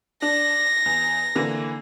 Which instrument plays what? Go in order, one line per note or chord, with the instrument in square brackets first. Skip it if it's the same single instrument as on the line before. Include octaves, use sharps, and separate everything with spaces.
[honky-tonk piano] D4 [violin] A#6
[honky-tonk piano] E2
D3 E3 A#3